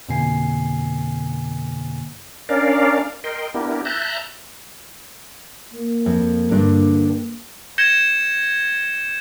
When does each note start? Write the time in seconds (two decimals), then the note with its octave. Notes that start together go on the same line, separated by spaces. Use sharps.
0.09 F2 B2 D3 A#3 G#5 C7
2.49 C#4 D4 A#4 D5 F5
3.24 A#4 D#5 G5 C6
3.54 B3 D4 E4 G4 A#4
3.85 E5 A5 A#5 F#6 G6
5.74 A#3
6.06 F2
6.51 G2 D3 D4
7.78 G6 G#6 A#6 C#7 E7 G7